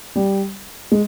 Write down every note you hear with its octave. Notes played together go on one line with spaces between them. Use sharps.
G3
G#3